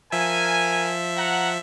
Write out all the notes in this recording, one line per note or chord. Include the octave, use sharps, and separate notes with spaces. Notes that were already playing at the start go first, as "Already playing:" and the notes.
F3 A#4 E5 G#5
F#5 A#5